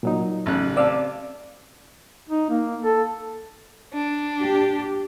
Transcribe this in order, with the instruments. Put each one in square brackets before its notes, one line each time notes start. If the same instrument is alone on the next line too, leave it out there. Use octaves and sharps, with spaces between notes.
[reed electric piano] A#2 F#3 D#4
[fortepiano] A1 C#3 F#6
[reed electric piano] C4 F5 A5 [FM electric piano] D5 D6 E6
[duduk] D#4
A#3
A4
[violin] D4
[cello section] G4